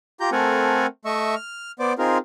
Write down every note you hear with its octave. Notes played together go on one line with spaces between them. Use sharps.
F4 G4 A#5 G6
A3 C4 A4 A#4 F#5 G#5
A3 D#5 E5 C#6 E6
F6
B3 C5 D5 D6
C4 D#4 F4 G#4 A#4